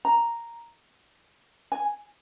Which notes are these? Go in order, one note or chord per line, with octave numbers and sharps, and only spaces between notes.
A#5
G#5